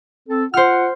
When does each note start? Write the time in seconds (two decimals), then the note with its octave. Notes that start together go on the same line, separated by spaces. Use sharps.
0.29 C4 A4
0.54 F4 C5 F#5 F6